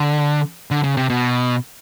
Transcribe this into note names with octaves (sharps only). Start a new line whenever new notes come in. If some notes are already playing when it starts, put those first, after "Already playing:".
Already playing: D3
D3
C#3
C3
B2